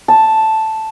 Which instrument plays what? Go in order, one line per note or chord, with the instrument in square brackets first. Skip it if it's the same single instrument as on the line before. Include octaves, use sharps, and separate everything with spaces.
[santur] A5